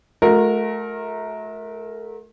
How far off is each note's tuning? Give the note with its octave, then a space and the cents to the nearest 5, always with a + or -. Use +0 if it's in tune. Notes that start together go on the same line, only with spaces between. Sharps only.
A3 -35 F#4 -40 A#4 -5